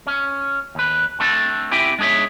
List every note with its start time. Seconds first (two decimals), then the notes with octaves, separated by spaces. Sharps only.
0.07 C#4
0.75 D#2 B4
1.20 A3 C4 D4 A4
1.71 C4 E4 G4 E5 G5 G#5
1.99 G#3 D4 G#4 C#5 E5